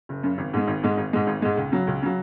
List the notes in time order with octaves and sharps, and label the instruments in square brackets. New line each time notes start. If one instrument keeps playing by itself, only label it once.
[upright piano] F#1
F#2 C#3
G#1
G#2 G#3
G#1
G#2 G#3
G#1
G#2 G#3
G#1
G#2 G#3
C#2
C#3 F#3
C#2
C#3 F#3